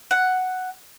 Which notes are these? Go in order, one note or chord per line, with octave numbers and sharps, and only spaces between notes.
F#5